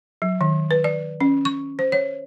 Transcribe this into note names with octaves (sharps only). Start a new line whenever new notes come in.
F#3
D#3
B4
D5
C#4
C#6
C5
C#5